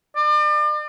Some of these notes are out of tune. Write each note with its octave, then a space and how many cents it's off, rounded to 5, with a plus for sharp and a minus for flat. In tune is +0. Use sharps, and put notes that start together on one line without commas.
D5 +40